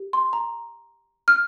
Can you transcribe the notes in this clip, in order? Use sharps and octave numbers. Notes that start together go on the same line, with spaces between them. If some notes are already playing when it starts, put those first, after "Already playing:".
Already playing: G4
C6
A#5
F6